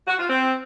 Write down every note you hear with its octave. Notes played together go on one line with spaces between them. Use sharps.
F#4
F4
C4